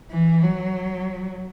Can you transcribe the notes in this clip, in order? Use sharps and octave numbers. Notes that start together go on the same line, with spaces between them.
E3
F#3